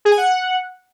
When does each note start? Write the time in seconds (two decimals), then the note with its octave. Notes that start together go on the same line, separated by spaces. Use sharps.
0.05 G#4
0.11 G#5
0.18 F#5